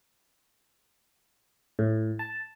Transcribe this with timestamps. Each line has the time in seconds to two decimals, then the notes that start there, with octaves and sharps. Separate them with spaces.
1.79 A2
2.19 A5